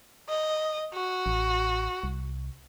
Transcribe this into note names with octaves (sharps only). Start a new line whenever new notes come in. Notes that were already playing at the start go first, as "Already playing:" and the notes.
D#5
F#4
A1
C2